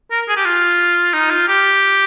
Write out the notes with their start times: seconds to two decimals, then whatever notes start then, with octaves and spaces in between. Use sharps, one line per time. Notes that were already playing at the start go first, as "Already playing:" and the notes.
0.11 A#4
0.29 G#4
0.36 G4
0.45 F4
1.14 D#4
1.30 F4
1.48 G4